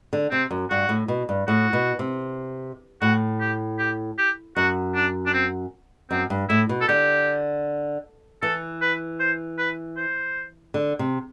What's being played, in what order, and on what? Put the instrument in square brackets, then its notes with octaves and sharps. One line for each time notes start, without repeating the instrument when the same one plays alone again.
[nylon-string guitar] D3
[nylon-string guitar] C3 [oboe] C4
[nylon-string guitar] F#2
[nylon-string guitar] G2 [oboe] F#4
[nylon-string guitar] A2
B2
G2
[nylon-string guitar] A2 [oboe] F#4
[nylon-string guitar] B2
C3
[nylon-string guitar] A2 [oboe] F#4
[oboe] G4
G4
G4
[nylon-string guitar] F#2 [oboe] F#4
[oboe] D4
D4
C4
[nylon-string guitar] F#2 [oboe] C4
[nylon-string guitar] G2
[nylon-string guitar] A2 [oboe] E4
[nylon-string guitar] B2
[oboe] A4
[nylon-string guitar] D3 [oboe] G4
[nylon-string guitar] E3 [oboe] A4
[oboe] B4
C5
B4
C5
[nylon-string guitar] D3
C3